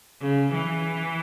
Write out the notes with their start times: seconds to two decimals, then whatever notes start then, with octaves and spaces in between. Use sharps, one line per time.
0.21 C#3
0.53 E3